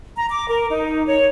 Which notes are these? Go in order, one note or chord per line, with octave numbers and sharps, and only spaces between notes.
A#5
D6
A#4
D#4
C#5